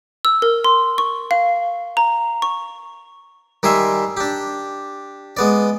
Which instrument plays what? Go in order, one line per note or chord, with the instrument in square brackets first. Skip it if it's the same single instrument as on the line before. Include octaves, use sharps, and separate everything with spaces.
[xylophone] E6
A#4
C6
C#6
F5
A#5
C#6
[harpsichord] D#3 G3 E5 G#5 C6
D4 G4
G#3 B3 D5